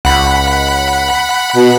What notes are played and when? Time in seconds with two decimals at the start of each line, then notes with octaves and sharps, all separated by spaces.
0.05 C#2 F#5 B5
1.56 B2